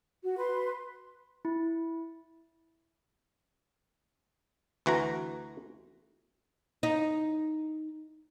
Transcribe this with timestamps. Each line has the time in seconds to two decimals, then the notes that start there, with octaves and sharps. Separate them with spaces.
0.23 F#4
0.38 B4 C6
1.45 E4
4.86 D2 E3 F#4 A#5
6.83 D#4